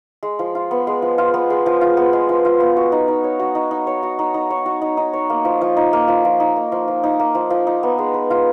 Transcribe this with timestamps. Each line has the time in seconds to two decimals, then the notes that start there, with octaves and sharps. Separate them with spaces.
0.23 G#3
0.39 F3
0.55 F4
0.71 B3
0.87 G#3
1.02 F3
1.18 F4
1.34 B3
1.50 G#3
1.66 F3
1.81 F4
1.97 B3
2.13 G#3
2.29 F3
2.45 F4
2.60 B3
2.77 F#4
2.92 D#4
3.08 D#4
3.24 C#5
3.39 F#4
3.55 D#4
3.71 D#4
3.87 C#5
4.03 F#4
4.19 D#4
4.34 D#4
4.50 C#5
4.66 F#4
4.82 D#4
4.97 D#4
5.13 C#5
5.30 A#3
5.45 F3
5.61 F3
5.77 D#4
5.93 A#3
6.08 F3
6.25 F3
6.40 D#4
6.56 A#3
6.72 F3
6.88 F3
7.04 D#4
7.20 A#3
7.35 F3
7.50 F3
7.67 D#4
7.83 B3
7.98 G#3
8.14 B4
8.30 F4